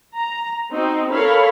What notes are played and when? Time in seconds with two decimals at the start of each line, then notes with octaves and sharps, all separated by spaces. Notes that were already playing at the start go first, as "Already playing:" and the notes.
0.14 A#5
0.71 C4 D#4 F#4
1.11 A4 A#4 C#5 F5 B5